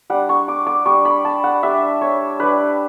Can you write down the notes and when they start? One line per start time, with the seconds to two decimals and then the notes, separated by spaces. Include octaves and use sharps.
0.10 G3 D4 F#5
0.29 C#6
0.48 D6
0.67 D6
0.86 G3 D4 C#6
1.05 B5
1.25 A5
1.44 F#5
1.63 G3 D4 E5
2.01 C#5
2.40 G3 D4 B4